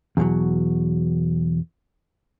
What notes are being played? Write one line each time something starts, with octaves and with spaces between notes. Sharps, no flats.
E2 B2 F3 F#3